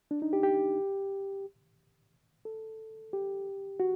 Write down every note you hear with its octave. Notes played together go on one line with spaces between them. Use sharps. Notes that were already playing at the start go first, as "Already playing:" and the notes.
D4
D#4
G4
G4
A4
G4
F#4